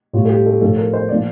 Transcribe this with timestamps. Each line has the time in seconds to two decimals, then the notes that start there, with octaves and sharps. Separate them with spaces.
0.13 A2 G3 F4
0.25 A4
0.29 G4
0.46 A4
0.61 A2 F3 A4
0.77 A#4
0.93 C5
1.09 A#2 F3 D5